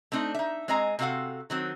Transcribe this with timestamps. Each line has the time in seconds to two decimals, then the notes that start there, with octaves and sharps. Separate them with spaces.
0.12 A3 C4 D4 D#4
0.34 D#4 E5
0.68 G#3 C4 D#5 G#5 A#5
0.99 C3 C4 F#4 A4 F5 F#5
1.50 D#3 F#3 C4